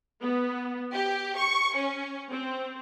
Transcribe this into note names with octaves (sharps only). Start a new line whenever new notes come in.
B3
G4
C#6
C#4
C4